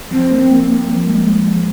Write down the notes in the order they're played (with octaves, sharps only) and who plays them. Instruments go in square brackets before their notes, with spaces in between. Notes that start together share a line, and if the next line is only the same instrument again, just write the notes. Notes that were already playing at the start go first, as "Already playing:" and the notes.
[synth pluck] F3 [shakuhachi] C4
[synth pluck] A#3
A#3
A#3
F3
G#3
G#3
F3